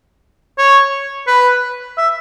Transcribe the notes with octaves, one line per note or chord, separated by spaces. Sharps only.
C#5
B4
E5